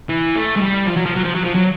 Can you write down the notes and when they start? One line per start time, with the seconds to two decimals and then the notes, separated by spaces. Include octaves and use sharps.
0.09 E3
0.36 A3
0.56 G#3
0.61 G3
0.86 F3
0.96 F#3
1.06 F3
1.16 F#3
1.25 F3
1.35 F#3
1.45 F3
1.55 F#3